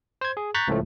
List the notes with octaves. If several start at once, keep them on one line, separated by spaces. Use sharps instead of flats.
C5 G#6
G#4
A#5 C#6 F#6 G6 A6 B6
C#2 A2 F3 A3